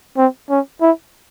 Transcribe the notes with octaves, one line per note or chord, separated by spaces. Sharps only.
C4
C#4
E4